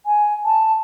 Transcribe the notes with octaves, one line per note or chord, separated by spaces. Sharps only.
G#5
A5